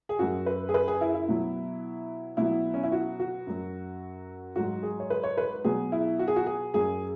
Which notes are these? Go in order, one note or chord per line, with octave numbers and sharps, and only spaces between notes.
G#4
F#2 F#3 F#4
B4
G#4
B4
G#4
E4
E4
B2 F#3
B2 F#3 E4
C#4
E4
F#4
F#4
F#2 F#3
G#2 F#3 F#4
G#4
C#5
B4
C#5
B4
B2 F#3 G#4
E4
F#4
G#4
F#4
G#4
F#2 F#3 G#4